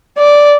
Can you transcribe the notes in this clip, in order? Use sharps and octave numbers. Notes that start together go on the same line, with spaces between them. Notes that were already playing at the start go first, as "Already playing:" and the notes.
D5